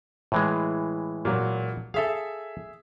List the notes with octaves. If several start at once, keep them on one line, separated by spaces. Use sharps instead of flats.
A2 E3 G#3
A#2 F#3
G#4 A4 E5 F5